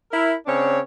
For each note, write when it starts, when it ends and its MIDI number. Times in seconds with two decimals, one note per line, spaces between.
0.11 0.33 64
0.11 0.33 70
0.46 0.79 49
0.46 0.79 60
0.46 0.79 62
0.46 0.79 73